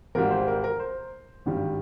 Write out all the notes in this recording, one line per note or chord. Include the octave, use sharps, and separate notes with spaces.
G#1 G#2 G3 A#4
C5
A#4
A#4
C5
G#1 G2 D#3 G3